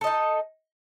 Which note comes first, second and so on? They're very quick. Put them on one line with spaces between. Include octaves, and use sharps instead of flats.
A4 D#5 D#4